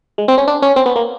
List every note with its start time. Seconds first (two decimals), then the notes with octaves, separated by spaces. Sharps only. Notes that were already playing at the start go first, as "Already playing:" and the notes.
0.18 G#3
0.28 C4
0.38 C#4
0.48 D4
0.62 C#4
0.76 C4
0.86 B3
0.96 A#3